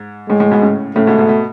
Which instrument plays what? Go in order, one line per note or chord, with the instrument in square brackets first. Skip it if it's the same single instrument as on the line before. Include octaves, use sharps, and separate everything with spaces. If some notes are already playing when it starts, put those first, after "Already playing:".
Already playing: [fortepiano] G#2
[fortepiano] A2 [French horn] G#3
[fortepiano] A2
G#2 B2
A2 C#3
[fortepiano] A2 C#3 [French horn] A3
[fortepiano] G#2 B2
G#2 B2
B2